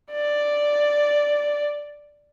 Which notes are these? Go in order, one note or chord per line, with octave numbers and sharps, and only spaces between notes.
D5